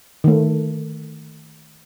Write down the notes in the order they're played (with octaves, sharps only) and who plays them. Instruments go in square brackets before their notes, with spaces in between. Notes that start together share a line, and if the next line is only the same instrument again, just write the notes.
[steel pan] D#3 A3